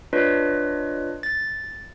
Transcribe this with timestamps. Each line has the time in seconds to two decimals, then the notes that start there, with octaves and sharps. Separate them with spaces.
0.13 D4 F4 B4 C#5 D#5
1.23 A6